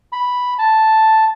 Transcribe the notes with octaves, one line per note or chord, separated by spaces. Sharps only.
B5
A5